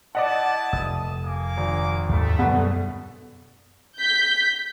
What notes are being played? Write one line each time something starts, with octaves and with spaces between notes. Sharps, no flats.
E4 D5 D#5 F#5 A5
F1 D#6
A#3 G#5 D6
G#1
D#2 G#2 A3
F#2 B2 D3 G3 B3
G6 B6